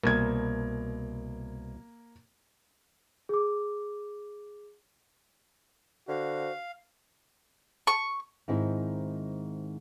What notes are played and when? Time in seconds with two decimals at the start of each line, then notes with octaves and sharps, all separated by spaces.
0.03 C2 B2 A#3 G#6
3.29 G#4 D6
6.08 D3 F#4 C5 F5
7.87 C#6
8.48 G#2 D#3 C4 E4